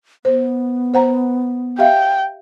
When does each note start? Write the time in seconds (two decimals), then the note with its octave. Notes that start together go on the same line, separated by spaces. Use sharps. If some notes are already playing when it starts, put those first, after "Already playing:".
0.25 B3 C5
0.94 C5 F#5 A#5
1.79 G4 E5 F5 G5